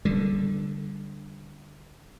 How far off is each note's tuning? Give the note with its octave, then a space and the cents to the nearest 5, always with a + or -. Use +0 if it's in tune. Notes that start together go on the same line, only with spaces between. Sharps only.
D3 +0 G3 +0